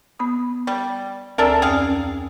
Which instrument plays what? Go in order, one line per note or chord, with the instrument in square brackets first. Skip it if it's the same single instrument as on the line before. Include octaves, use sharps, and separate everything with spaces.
[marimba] B3 B5 D#6
[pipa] G3
[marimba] D2 G#5 E6 [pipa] D4 A4 A#4
[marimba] F2 C#4 [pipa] G#4 F5